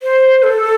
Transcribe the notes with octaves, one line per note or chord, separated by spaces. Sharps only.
C5
A4